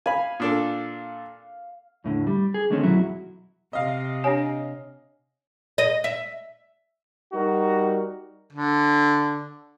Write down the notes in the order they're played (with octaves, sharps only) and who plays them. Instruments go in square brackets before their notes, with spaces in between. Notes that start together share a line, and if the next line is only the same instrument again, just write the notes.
[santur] F5 [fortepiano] G#5 B5
[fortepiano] A#2 D4 A4
[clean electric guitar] E2 A2 D3
G3
G#4
D3 D#3 G#3 A3 C4 C#4
B1 E2 F#3 E4 F#4 E5
[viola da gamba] C3 [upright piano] D#5 F5
[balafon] D4 G4 [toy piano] C#5 G#5
[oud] D#5
E5
[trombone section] G3 D#4 F#4 A#4
[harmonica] D3